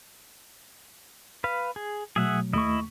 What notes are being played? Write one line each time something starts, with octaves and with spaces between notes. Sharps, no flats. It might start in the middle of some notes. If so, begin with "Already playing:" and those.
B4 F5
G#4
B2 F#3 A3 G#4 E5 F#5
D#2 A3 E4 D#5 C#6